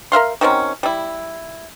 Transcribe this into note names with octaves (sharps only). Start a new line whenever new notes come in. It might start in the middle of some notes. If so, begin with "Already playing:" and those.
A#4 E5 F5 C6
D#3 F#3 C4 C#4
G3 E4